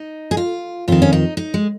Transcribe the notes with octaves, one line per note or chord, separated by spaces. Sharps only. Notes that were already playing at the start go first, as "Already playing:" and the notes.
Already playing: D#4
G#4
F4
F2 D#3 F4
C#4
D#4
D#4
G#3